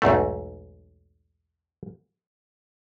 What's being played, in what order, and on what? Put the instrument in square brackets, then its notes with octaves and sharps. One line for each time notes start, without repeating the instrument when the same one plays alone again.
[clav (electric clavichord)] B1 E2 G#2 A3